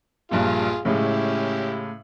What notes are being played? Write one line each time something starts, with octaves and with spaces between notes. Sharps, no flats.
A#1 G2 A#2 F4 G#4
A2 C#3 G#3 C#4 E4 G4